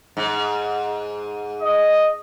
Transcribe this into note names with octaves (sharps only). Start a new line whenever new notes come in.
G#2
D#5